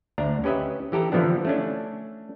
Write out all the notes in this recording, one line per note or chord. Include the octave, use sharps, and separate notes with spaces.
D2 D4 A#5
C#4 G4 B4 D#5 E5
E3 G4 A4 A#5
D3 E3 F3 B3 D4
A3 C#4 D4